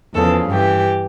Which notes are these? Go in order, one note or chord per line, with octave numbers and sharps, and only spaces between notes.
E2 C#3 F3 A4
G2 E3 G4